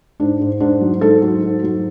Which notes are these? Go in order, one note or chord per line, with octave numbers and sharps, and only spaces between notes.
G#2 D4
G#2
G#2 D4
F#3
G#2 A4
F#3
G#2
F#3